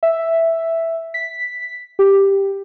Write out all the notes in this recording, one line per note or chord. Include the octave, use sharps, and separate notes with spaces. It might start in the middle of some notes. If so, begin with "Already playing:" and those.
E5
B6
G4